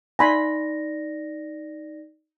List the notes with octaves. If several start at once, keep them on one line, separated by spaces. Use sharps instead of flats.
D#4 D5 G#5 B5 C6 A#6